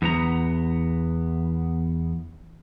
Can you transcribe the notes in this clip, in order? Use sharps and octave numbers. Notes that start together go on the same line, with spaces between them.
E2 B3 A#5